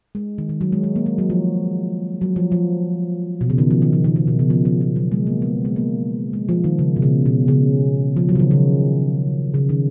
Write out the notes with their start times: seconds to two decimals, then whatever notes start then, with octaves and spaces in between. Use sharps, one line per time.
0.15 G#3
0.38 D#3
0.49 D#3
0.61 F#3
0.72 G#3
0.83 G#3
0.96 A#3
1.06 G#3
1.18 F#3
1.30 F3
2.21 F#3
2.36 F3
2.52 F3
3.41 B2
3.50 C#3
3.58 D#3
3.70 F3
3.82 D#3
3.93 F3
4.04 D#3
4.16 D#3
4.27 B2
4.39 C#3
4.50 F3
4.65 F3
4.81 F3
4.96 F#3
5.12 G#3
5.27 A#3
5.42 B3
5.65 G#3
5.76 A#3
6.33 G#3
6.49 F3
6.64 D#3
6.79 C#3
6.96 B2
7.02 C#3
7.26 B2
7.48 C#3
8.17 F3
8.29 F#3
8.35 C#3
8.40 D#3
8.51 C#3
9.54 C#3
9.69 D#3